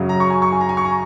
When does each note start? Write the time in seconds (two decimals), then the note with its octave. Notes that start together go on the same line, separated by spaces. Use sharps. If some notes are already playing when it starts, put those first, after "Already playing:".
Already playing: F#2 C#3 F#3
0.09 A#5
0.20 C#6
0.30 G#5
0.42 C#6
0.52 G#5
0.61 A#5
0.69 G#5
0.77 C#6
0.85 A#5